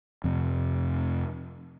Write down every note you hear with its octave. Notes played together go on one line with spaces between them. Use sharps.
F2 C3